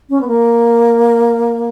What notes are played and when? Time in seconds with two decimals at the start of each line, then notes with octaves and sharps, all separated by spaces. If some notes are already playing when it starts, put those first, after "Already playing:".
0.09 C#4
0.21 B3
0.28 A#3